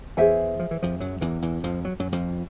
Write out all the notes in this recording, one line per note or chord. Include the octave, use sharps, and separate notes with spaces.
E2 E3 G#4 C5 E5 G#5
F3
E3
F2 F3
F#2 F#3
E2 E3
E2 E3
F2 F3
F#3
F#2 F#3
F2 F3